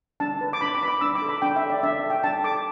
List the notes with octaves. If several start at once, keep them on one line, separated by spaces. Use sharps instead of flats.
D4 A5
B4
D6
D4 B5
D6
B4 B5
D6
D4 E6
D6
A4
B5
D4 G5
E5
A4
D5
D4 E5
A4
G5
D4 A5
A4 D6